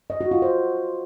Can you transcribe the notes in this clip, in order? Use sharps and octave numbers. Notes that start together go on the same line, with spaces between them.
D#5
F#4
F4
C5